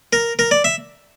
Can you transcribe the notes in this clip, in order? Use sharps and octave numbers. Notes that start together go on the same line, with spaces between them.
A#4
A#4
D5
E5